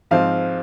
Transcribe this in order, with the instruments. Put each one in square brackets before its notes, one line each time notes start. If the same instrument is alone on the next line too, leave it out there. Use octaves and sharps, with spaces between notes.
[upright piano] G#2 F3 C4 F5